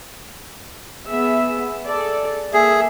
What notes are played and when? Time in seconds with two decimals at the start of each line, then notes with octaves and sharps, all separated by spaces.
1.09 B3 G#4 E5
1.87 G#4 A4 D5
2.53 A#3 G#4 A4 E5